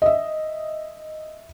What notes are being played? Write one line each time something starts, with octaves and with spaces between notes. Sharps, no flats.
D#5 E5